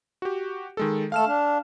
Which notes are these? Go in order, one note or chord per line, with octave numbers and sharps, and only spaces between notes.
F#4 G4
D#3 G#3 A4
A3 A4 F5 F6 E7
D4